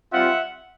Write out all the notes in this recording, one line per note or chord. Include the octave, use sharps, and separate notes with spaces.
G3 C4 F4 E5 F#5